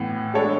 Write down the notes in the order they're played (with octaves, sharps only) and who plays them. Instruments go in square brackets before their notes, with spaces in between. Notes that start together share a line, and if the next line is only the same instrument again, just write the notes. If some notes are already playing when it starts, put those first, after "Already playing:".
Already playing: [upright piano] A2 E3 B3
G#3 D4 A4 C#5